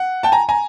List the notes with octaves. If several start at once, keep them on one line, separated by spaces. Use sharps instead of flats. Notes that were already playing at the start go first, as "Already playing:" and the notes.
Already playing: F#5
G5 A5
G#5 A#5
G#5 A#5